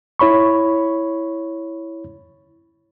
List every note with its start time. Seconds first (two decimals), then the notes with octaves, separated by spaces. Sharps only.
0.19 E4 C#5 B5 C#6